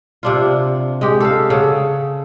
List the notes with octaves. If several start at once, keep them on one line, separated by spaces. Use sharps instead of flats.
C3 D4 F4
G#3 G4
A4 F5
C#3 A4 F#5